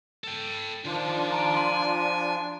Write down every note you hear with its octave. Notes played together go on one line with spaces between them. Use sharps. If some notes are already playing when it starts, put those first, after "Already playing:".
A4 G5
D#3 F3 D4 F4
A#5 D7
G#5 C6